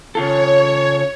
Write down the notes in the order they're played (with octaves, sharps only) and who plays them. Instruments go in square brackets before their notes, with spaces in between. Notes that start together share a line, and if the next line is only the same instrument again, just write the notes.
[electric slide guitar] C#3 F4 A4 [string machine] C#5